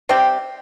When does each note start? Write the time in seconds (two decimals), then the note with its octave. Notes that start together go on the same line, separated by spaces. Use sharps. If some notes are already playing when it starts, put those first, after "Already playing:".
0.09 C3 G3 C4 G4